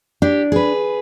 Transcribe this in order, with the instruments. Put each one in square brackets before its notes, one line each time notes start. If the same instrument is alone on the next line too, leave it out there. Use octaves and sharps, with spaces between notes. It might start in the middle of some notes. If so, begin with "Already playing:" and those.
[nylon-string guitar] D4 [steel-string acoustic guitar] G4
[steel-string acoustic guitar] G#4 B4